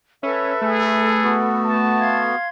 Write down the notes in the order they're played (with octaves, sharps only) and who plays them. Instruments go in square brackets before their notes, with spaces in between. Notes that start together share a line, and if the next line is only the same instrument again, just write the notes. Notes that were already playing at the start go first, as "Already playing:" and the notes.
[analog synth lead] C#4 [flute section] A4 B4 B5 [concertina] E5
[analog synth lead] A3 [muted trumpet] G#4
[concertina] B3 F#4
[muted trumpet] A5
[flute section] F5 C6 G#6